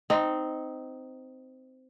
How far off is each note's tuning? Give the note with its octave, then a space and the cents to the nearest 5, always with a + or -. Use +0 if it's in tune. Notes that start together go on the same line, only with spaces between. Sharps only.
C4 -15 D#4 +0